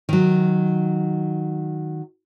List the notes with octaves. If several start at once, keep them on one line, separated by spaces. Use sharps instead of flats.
D#3 F#3